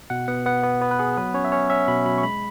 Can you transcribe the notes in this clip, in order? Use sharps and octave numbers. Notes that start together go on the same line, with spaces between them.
B2 F#5
B3 F#5
B3 F#5
B3
B3 B4
B4
B3 G#4
F#3 B4
C#4 C#5
E5
C#4 C#5
C#4 E5
B2 B5
F#3 B5
C#6
G#3 B5